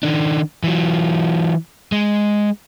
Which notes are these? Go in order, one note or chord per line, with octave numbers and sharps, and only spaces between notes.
D#3 D4
E3 F#3
G#3